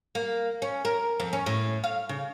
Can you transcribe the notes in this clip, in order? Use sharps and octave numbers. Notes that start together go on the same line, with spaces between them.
A#3
C#4
A#4
F2
C#4
A2
F5
C#3